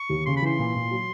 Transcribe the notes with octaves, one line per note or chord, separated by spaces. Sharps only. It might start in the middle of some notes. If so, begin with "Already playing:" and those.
Already playing: C#6
D#2
C#3 C6
B5
E3 C6
A#2
A#2
F#3